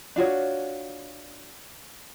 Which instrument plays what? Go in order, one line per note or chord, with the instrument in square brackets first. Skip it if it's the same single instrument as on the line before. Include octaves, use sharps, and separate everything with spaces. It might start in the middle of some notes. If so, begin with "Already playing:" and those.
[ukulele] D4 F4 F#4 C#5